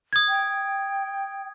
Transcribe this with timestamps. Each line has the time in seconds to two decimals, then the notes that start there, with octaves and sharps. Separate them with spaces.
0.13 D#6 G#6
0.28 G5